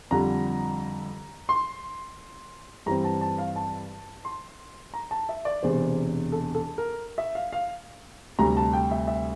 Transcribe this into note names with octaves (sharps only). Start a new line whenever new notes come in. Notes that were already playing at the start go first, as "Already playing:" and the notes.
F2 D3 G3 A#5
C6
G2 E3 G3 C4 A#5
A5
A5
F5
A5
C6
A#5
A5
E5
D5
E1 E2 C3 C5
A4
A4
A#4
E5
F5
F5
D2 C3 G3 A#5
A5
G5
E5
E5